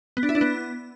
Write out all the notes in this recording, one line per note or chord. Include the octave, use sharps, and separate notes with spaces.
B3
D4
E4
D4
B3